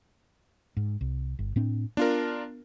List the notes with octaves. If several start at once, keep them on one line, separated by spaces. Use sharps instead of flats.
G#2
C2
G1
A2 C4 D4
B3 D4 F4 A#4